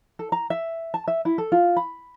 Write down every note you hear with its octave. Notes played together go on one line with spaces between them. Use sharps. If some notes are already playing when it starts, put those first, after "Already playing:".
A4
A#5
E5
A5
E5
E4
A4
F4
B5